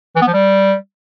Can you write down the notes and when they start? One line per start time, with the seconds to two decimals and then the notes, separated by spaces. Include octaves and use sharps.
0.16 E3
0.22 B3
0.27 F3
0.33 G3